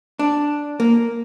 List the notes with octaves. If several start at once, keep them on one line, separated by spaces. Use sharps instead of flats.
D4
A#3